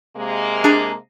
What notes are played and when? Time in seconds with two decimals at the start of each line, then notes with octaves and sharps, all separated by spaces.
0.17 C3 G#3 A#3
0.64 D4 G#4 A#5